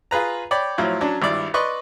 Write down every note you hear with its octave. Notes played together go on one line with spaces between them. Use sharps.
F4 G#4 B4 A#5
C#5 D5 G5 B5
A2 F3 F#3 E4 F4
F#3 C#4 D4 A5
G#1 G2 E4 D5
B4 D5 D#5 C6 C#6